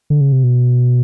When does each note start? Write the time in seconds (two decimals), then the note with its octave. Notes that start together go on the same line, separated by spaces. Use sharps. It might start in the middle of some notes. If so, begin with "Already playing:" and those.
0.10 D3
0.21 C#3
0.32 C3
0.43 B2